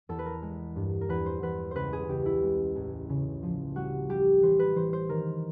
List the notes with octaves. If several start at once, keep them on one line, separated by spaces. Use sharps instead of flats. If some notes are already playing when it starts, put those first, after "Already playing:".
E2 A4
B4
A#4
G#3
G2
A#4
E2 B4
C5
E2 B4
C#2 B4 C5
G#4
C#2 G4
E4
G#3
A1
C#3
F3
G3 F#4
G3 G4
E3 C5
B4
E3 C5
C5
D#3 A#4